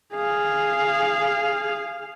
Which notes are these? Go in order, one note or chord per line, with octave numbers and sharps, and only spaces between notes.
G#4 F5